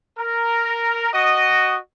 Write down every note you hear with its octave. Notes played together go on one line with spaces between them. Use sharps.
A#4
F#4 D#5